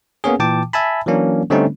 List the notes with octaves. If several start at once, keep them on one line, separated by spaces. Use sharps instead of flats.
A#3 B3 C#4 G#4
A#2 E3 G5 A5 D6
E5 G#5 A5 B5
E3 F#3 A#3 C#4 D4
D3 G3 A3 C4 C#4 D#4